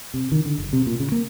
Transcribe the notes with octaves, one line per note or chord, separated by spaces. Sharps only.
C3
D#3
D3
F#1
C3
A#2
C#3
A#3